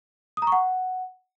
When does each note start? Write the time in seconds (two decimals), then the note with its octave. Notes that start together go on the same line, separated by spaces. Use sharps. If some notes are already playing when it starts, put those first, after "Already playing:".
0.37 D#6
0.42 A#5
0.47 C#6
0.52 F#5